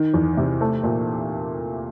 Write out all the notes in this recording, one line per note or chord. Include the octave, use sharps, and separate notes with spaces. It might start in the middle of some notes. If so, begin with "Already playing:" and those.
Already playing: D#3
E2
C3
A3
A#2